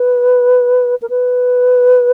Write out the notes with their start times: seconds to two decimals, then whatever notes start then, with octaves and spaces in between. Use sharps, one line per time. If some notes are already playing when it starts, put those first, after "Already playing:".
Already playing: B4
1.02 A#4
1.10 B4